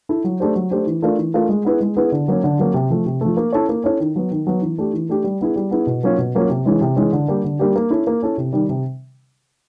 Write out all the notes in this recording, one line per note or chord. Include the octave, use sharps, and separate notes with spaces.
E4 A4
F#3
A3 D4 G4 C5
F#3
A3 D4 G4 C5
E3
A3 D4 F4 A#4
E3
A3 D4 F4 A#4
G#3
B3 E4 G#4 B4
G#3
B3 E4 G#4 B4
D3
F#3 A#3 C#4
D3
F#3 A#3 C#4
C3
F3 A3
C3
F3 A3
A#3
C#4 E4 A4 C#5
A#3
C#4 E4 A4 C#5
D#3
F#3 B3
D#3
F#3 B3
E3
A3 D4 G4
E3
A3 D4 G4
G3
B3 E4 G#4
G3
B3 E4 G#4
B2
F#3 A#3 C#4 F4
B2
F#3 A#3 C#4 F4
C3
E3 G#3 C#4
C3
E3 G#3 C#4
D3
G3 A#3 D4 G4
D3
G3 A#3 D4 G4
A#3
C#4 E4 A4
A#3
C#4 E4 A4
C3
D#3 G3
C3